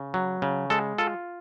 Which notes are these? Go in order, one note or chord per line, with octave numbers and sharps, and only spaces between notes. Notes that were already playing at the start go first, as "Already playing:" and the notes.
Already playing: C#3
F#3
C#3
G#3 A4
F4 A4